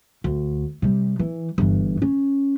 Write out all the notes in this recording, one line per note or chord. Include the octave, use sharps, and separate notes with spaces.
D2
C3 G3
E3
G1 E3
C#4